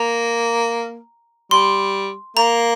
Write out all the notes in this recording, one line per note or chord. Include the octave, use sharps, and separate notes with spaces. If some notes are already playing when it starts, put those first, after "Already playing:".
Already playing: A#3 A#5
G3 C6
A#3 A#5